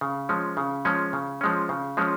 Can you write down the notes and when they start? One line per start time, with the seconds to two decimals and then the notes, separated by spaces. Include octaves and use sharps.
0.01 C#3
0.29 F3 G#3 C#4
0.57 C#3
0.85 F3 G#3 C#4
1.13 C#3
1.41 F3 G#3 C#4
1.69 C#3
1.97 F3 G#3 C#4